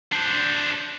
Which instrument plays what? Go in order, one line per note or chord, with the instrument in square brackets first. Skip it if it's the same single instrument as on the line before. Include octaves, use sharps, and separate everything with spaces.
[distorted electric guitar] D4 C5